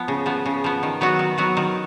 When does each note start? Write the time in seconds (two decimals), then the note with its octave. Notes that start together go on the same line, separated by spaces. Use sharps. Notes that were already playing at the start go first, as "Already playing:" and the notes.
Already playing: F3 B3
0.08 C#3
0.26 F3 B3
0.46 C#3
0.64 F3 B3
0.83 D#3
1.01 F#3 B3 F#4
1.19 D#3
1.38 F#3 B3 F#4
1.57 D#3